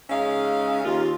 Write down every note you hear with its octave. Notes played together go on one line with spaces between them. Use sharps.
C#3 G#3 C#4 D#4 E5 F5
D#2 F4